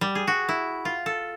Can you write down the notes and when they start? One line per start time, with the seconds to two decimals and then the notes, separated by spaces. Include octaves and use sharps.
0.01 G3
0.15 G#4
0.27 F#4
0.49 E4
0.85 F4
1.06 A4